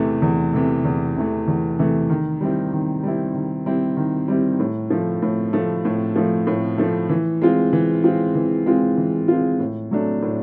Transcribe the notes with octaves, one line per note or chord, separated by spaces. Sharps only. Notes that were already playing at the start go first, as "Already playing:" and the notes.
Already playing: E2 C3 E3 A3
E2
C3 E3 A3
E2
C3 E3 A3
E2
C3 E3 A3
D#3
G3 C4 E4
D#3
G3 C4 E4
D#3
G3 C4 E4
D#3
G3 C4 E4
A2
F3 A3
A2
F3 A3
A2
F3 A3
A2
F3 A3
E3
G#3 C4 F4
E3
G#3 C4 F4
E3
G#3 C4 F4
E3
G#3 C4 F4
A2
F#3 A3 D4
A2